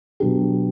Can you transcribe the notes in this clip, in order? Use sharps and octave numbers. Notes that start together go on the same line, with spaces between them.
B2 F#3 B3 D4 G4